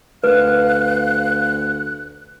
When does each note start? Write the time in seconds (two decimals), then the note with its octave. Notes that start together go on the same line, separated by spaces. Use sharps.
0.24 D2 B4 F5 F#6